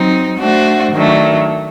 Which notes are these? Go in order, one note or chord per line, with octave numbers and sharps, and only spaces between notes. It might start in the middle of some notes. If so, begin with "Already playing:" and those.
Already playing: F#3 C4 D#4
A3 D4 F#4 C5
D#3 F#3 A3 D4